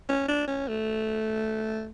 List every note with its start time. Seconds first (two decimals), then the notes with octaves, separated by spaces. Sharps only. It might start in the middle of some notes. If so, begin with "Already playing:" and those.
0.09 C#4
0.28 D4
0.48 C#4
0.68 A3